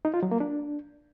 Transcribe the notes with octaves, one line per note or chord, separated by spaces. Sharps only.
D#4
F4
F#3
A#3
D4